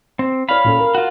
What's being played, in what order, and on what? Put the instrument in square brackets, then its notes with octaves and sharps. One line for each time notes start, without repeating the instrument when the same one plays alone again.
[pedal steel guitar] C4
[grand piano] C#5 D5 F6 [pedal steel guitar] F5 B5
[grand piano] A#2 C#4 A4
A#4
[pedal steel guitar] F4 F#4